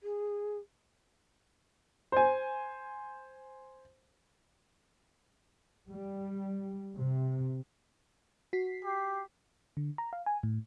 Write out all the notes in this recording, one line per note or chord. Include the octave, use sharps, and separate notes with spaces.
G#4
C5 G#5
G3
C3
F#4 B6 C7
G4
D3
A#5
F5
G#5
A2